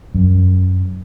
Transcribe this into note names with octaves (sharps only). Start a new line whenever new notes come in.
F#2